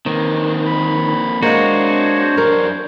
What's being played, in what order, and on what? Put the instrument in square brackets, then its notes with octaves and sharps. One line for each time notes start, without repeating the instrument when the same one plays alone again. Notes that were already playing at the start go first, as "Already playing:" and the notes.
[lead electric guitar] D#3 [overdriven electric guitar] A#3 C4
[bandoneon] B5
[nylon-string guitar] G#3 A#3 [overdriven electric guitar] D4 D#5 [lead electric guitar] F#4 [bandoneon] C5 C#5
[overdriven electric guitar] F#2 D4 [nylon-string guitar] A#4